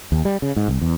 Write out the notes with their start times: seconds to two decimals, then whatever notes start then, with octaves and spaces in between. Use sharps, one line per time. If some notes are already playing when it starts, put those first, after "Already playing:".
0.12 D#2
0.25 G3
0.42 C#3
0.56 G#2
0.68 C2
0.81 E2